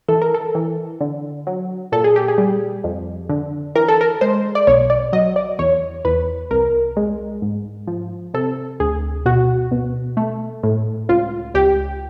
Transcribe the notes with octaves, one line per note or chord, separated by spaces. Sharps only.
E3 A4
A#4
A4
E3
D3
F#3
A#2 A4
G#4
G4
G#4
G3
F2
D3
E3 A#4
A4
A#4
G#3 C5
D5
B1 C#5
D5
F#3 D#5
D5
E2 C#5
E2 B4
C2 A#4
G#3
G#2
F3
C3 A4
D2 G#4
B2 F#4
B2
A3
A2
C#2 F4
C#2 G4